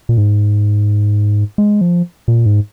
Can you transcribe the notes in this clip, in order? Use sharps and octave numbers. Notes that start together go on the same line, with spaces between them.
A#2
G#2
G#3
F3
A#2
G#2